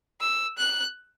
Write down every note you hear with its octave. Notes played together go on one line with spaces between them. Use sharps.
E6
F#6